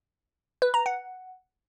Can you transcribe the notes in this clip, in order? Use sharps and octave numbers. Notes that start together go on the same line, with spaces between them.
B4
A#5
F#5